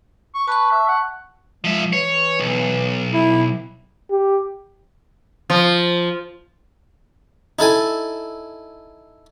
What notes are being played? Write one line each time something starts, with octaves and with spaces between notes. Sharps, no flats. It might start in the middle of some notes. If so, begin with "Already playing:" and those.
C#6
B4 A5 C#6
E5
F#5
F3 G#3 E5
E3 C#5
B1
E4
G4
F3
D#4 E4 A4 G#5